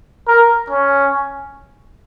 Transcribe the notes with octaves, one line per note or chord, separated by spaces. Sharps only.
A#4
C#4